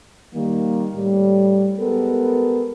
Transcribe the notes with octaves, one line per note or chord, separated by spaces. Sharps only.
D#3 G3 A#3
A2 G3
G#3 B3 G4 A4 A#4